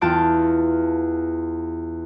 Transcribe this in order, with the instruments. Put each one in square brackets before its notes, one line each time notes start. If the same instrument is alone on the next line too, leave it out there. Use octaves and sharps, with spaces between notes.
[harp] E2 F4 A5 G6 D7